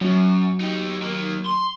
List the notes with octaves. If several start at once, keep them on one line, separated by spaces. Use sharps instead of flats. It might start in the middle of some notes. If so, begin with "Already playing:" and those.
F#2 F#3
D#4 G4
D#3 A#3
C6